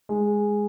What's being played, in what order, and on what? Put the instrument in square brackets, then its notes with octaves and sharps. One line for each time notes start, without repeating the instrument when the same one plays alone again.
[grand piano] G#3